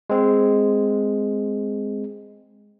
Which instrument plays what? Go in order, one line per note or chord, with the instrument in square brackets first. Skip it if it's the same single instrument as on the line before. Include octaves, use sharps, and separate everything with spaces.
[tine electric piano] G#3 C4